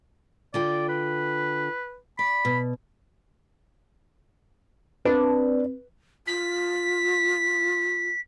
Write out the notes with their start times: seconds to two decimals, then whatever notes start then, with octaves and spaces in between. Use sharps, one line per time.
0.54 D3 F4 D5 G5
0.89 B4
2.19 D5 B5
2.45 B2
5.05 C4 D4 B4
6.27 F4 B6